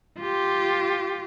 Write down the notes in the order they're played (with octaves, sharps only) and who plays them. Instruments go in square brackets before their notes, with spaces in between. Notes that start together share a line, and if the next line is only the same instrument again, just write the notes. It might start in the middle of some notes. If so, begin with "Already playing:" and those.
[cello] F4 G4